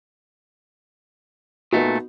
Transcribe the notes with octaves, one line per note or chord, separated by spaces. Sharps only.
A#2 A3 B3 D#4 F#4